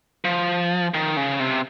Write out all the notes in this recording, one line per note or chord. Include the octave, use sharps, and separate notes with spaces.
F3
D#3
C#3
C3